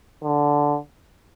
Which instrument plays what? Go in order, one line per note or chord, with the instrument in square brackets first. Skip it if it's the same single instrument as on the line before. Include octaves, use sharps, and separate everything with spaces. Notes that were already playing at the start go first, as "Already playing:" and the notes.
[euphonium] D3